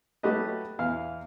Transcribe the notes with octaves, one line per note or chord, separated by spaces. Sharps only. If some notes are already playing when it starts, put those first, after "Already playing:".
F#3 A3 F#4 G4 B4 D#5
E2 F5 F6